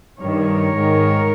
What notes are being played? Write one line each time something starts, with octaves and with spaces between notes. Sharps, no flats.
G2 D#3 A#4 C#5
G#2 D#3